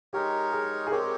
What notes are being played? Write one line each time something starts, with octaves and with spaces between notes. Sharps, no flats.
G#3 D#4 G4 A#4 C#5
G#4
G#4
G#3 C4 G4 A#4 C#5